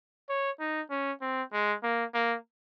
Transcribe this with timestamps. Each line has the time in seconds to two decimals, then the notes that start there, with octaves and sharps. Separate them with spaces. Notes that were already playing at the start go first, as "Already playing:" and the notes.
0.29 C#5
0.60 D#4
0.90 C#4
1.21 C4
1.53 G#3
1.83 A#3
2.14 A#3